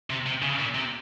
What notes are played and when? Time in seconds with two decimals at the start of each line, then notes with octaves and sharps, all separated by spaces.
0.10 C3
0.26 C3
0.42 C#3
0.59 A#2
0.75 C3